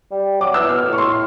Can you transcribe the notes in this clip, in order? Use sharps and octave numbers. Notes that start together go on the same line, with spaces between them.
G3
F#3 D6
E3 E6
B2 F6
A2
C#6
C6